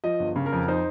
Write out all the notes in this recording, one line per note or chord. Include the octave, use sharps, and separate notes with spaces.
F3 D#5
G1
C#3
A#4
F2
D#4 C5